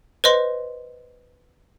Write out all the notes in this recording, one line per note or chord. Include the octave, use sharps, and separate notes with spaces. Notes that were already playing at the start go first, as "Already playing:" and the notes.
B4 C5 D#5 C6